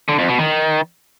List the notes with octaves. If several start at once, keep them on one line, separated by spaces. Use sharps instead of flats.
D3
F2
B2
D#3